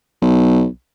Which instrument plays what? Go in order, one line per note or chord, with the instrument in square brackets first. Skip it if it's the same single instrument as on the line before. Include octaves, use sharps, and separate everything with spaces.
[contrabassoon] B1